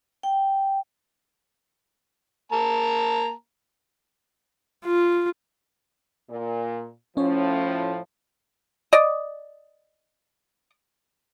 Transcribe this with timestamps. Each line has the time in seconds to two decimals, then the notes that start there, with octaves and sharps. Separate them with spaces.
0.23 G5
2.52 A#3 A5 A#5
4.86 F4
6.30 A#2
7.17 A2 F3 C#4 C#5
8.93 D5 D#5